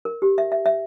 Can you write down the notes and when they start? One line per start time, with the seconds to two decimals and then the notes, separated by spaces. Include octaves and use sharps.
0.05 A#4
0.22 G4
0.38 E5
0.52 E5
0.66 E5